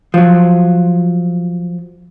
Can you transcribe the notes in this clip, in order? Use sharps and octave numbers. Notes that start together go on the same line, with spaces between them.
F3 F#3